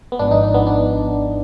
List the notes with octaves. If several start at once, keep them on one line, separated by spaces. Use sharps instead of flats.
B3
G#1 G#2 F3 D4
D#4
D4
B3
D4